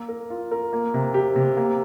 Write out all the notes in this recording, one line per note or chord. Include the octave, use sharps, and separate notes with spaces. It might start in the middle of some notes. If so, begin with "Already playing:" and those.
Already playing: A#3
A#4
F4
A#4
A#3
C3
G4
C3
A#3